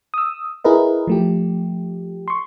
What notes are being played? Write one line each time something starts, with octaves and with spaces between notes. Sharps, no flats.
D#6 E6
E4 G#4 A#4 B4 D#5
F3 A3 G4
C6 C#6